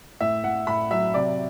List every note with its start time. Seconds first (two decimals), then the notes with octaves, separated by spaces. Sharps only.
0.20 A2 E5
0.43 A2 F#5
0.67 A2 B5
0.90 F#3 E5
1.14 C3 D5